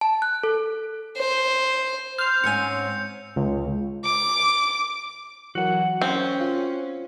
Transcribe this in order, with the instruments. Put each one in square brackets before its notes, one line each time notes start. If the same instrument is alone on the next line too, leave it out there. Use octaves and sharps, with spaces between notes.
[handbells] A5
F#6
A4
[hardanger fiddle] C5
[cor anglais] C5 [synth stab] F6 [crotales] G6 F7
[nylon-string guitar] G#2 C#4 G#5 [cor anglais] C4 [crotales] C#7
[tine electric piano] C#2
[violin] D6
[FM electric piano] E3 F#3 A#4 [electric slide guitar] F#4 F#5
[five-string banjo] C4 [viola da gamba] C#4
[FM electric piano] F4